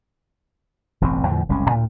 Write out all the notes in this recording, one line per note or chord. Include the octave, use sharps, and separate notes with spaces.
E1 A1 G2 C4
E2 A2 D3 F3
F#1 C2 G#3 C#4
D2 A2